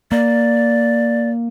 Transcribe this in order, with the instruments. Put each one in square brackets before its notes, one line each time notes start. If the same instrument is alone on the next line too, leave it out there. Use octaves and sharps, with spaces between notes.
[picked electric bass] A#3 [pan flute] D5